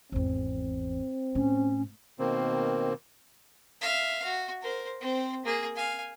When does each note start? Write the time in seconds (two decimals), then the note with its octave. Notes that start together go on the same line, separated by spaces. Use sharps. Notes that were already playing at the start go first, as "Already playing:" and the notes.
0.12 G#1 E2 C4
1.35 A2 C#4
2.19 B2 D#3 A#3 C4
3.81 E5 F5
4.24 F#4
4.62 A#4 C5
5.01 C4 C5
5.45 A#3 G#4
5.76 F5 G#5